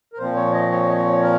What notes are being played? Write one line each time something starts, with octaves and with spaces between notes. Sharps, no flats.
A#4
A#2 F3 C4 C5
C#5
D#5
C#5
D#5
C#5
A#4